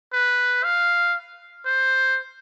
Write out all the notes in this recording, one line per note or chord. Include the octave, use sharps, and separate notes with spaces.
B4
F5
C5